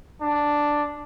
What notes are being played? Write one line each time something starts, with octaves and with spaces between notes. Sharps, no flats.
D4